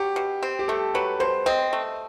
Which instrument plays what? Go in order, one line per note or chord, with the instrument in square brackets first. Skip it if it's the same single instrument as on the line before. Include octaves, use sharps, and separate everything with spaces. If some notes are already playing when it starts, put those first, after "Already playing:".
Already playing: [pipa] F#3 [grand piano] G4
[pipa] B2
C4
[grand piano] G4
[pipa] A3 [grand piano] A4
[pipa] F#3 [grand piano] B4
[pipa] B2 [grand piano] C5
[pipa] C4 [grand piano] D#5
[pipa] A3